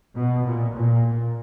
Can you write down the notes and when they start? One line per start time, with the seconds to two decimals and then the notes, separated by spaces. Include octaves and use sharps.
0.15 B2
0.45 A#2
0.74 A#2